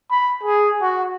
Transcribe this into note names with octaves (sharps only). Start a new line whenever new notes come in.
B5
G#4
F#4